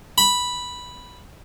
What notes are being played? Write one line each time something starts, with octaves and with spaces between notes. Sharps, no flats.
B5